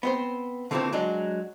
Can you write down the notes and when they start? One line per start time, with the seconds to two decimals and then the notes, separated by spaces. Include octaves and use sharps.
0.03 B3 C4 C5
0.71 D3 E3 F3 A3 A#3 C4
0.93 F#3 G#3 D4